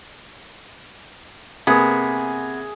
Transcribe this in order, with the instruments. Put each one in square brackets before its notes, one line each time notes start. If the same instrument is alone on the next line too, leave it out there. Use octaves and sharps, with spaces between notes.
[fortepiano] C3 A#3 [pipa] B3 [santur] G#4